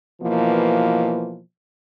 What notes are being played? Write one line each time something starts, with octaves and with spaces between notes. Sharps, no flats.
B2 E3 F3 A#3